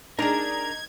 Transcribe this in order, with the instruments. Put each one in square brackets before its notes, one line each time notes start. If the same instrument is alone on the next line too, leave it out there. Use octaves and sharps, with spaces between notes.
[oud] D4 G#4 [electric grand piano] D#4 [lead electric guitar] A#4 A#5 [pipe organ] G#6